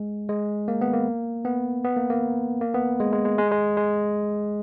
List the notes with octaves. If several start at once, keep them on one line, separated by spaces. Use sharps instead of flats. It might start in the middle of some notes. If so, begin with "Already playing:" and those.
Already playing: G#3
G#3
A#3
B3
A#3
B3
B3
A#3
A#3
A#3
B3
G#3
G#3
G#3
G#3
G#3
G#3